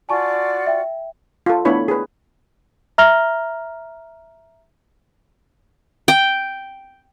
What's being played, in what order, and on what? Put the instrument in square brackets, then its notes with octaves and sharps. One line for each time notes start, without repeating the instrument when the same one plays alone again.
[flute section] F4 F#4 D5 [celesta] G#5 A5 C#6
[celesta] E5 G5
[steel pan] F4 A4
A3 B3 D4 E4 C#5 B5
G#4 B4
[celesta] E5 A#5 F6 A#6 F7 G7
[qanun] G5